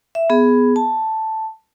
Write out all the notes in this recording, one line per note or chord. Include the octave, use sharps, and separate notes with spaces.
E5
B3 G#4
A5